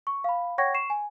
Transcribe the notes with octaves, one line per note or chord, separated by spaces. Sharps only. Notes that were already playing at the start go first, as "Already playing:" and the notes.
C#6
F5 B5
C#5 F#5 G5 C#6 G#6 A#6
C#6 C7 E7
G#5